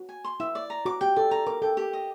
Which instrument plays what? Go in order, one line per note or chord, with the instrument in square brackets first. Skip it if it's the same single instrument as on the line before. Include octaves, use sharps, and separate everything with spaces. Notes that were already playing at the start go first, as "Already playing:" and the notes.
Already playing: [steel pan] F#4
[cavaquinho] G#5
C6
[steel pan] E4 [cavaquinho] E5
[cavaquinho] D5
A#5
[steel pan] F#4 [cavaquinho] D6
[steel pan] G4 [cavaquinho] G5
[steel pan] A4 [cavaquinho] D5
[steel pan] A4 [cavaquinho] A#5
[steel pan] A#4 [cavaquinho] D6
[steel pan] A4 [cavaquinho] G5
[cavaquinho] G4
D#5